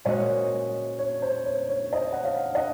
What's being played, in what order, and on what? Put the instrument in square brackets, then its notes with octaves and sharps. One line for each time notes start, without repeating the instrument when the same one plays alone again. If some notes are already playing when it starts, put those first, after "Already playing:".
[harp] A#2 G#3 C#4 F#4 [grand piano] C5 D#5
[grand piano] C#5
C5
C#5
C#5
C5 D#5
F#5
C#5 F5
D#5 F#5